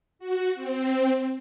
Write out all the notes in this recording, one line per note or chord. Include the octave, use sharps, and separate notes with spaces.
F#4
C4